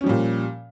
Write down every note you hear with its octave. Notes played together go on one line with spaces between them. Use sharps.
A#2 F3 G3 C#4